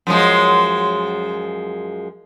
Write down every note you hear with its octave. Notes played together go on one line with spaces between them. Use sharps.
F#2 F3 G#3